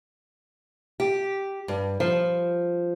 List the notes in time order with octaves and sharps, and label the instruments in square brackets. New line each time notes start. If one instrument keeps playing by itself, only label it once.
[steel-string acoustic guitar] G4
G2
F3